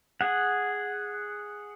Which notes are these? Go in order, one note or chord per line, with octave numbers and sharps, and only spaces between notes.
G#4 F#5